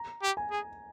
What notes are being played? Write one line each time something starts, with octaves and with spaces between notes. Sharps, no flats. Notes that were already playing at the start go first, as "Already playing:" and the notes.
Already playing: A#5
G4
G#5
G#4